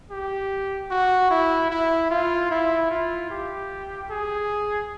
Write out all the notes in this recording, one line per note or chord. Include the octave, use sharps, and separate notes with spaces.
G4
F#4
E4
E4
F4
E4
F4
G4
G#4